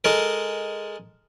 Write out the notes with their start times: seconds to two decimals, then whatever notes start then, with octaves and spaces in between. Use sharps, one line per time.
0.04 G#3 A4 A#4